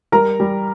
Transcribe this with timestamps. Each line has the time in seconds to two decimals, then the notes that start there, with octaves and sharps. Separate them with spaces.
0.12 G3 A#4 A#5
0.40 G3